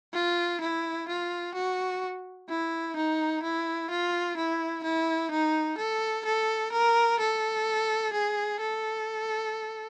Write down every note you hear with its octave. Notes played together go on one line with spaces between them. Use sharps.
F4
E4
F4
F#4
E4
D#4
E4
F4
E4
E4
D#4
A4
A4
A#4
A4
G#4
A4